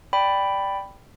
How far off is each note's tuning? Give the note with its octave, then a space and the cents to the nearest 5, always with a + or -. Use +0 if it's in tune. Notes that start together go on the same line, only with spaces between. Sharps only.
D5 +0 G5 +0 B5 +5